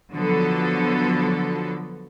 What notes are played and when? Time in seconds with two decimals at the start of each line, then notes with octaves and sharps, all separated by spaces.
0.13 D3 F3 F#3 B3 A4